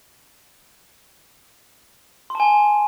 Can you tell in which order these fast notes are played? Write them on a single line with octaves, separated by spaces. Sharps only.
C6 A5 G#5